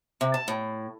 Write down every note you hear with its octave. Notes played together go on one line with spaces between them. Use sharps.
C3
A5
A2